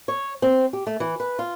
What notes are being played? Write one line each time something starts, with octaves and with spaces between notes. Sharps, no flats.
C#5
C4
G4
A3
E3
B4
F4